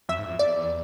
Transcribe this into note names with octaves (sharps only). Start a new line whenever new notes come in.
F2 E5
G#2
F2
E2 D5